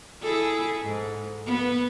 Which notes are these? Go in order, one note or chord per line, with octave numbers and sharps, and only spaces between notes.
E4 G#4 A4
G#2
B3 B4